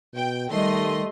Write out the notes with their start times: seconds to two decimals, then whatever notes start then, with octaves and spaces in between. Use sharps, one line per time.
0.14 B2 G5
0.50 D#3 G3 A3 D#5 C6